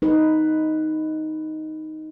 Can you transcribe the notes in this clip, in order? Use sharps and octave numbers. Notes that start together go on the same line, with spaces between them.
D#4 B4